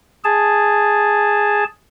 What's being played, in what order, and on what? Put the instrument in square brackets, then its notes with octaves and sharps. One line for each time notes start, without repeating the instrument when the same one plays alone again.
[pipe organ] G#4 A5